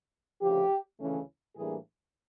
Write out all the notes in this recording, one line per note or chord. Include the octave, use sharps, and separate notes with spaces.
D2 C#3 F3 G4
D2 C#3 E3 A3 C#4
A2 E3 G3 A#3 D4 G#4